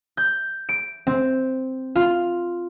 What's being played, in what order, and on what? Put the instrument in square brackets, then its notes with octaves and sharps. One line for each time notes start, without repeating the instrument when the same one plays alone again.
[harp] G6
D7
C4
F4